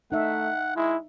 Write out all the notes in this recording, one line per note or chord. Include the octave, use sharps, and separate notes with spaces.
A3 D#4 E5 F#5
G#3 E4